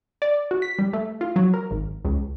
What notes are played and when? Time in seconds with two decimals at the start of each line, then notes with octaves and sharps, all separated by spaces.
0.22 D5
0.51 F#4
0.62 B6
0.79 G3
0.93 A3
1.21 F4
1.36 F#3
1.54 A#4
1.71 G#1
2.05 C#2